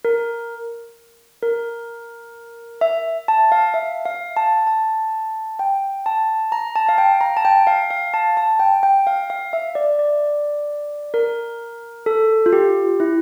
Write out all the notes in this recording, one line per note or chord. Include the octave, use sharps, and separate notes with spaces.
A#4
A#4
E5
A5
F5
E5
F5
A5
A5
G5
A5
A#5
A5
F5
G5
A#5
A5
G5
F5
F5
A5
A5
G5
G5
F5
F5
E5
D5
D5
A#4
A4
F4
G4
E4